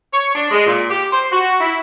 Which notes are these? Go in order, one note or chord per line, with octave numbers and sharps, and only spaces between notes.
C#5
D4
G#3
A#2
G4
C5
F#4
E4